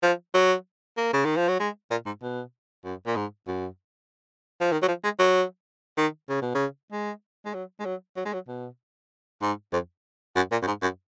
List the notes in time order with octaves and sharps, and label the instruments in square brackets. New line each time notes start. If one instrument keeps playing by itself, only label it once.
[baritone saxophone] F3
F#3
A#3
C#3
D#3
F3
F#3
G#3
A#2
G#2
B2
F#2
A#2
G#2
F#2
F3
D#3
F#3
F3
G#3
F#3
D#3
C#3
B2
C#3
G#3
G#3
F#3
G#3
F#3
F#3
G#3
F#3
B2
G#2
F2
F#2
A#2
F#2
G#2
F#2